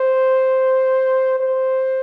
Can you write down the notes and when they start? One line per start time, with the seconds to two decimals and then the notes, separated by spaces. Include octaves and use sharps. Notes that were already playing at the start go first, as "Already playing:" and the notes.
Already playing: C5
1.39 C5